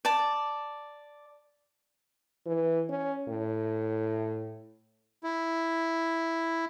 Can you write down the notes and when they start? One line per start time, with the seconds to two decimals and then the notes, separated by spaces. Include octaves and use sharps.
0.05 D5 A5
2.46 E3
2.89 C#4
3.28 A2
5.24 E4